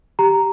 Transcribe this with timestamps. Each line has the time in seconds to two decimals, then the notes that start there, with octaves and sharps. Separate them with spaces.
0.19 G4 A#5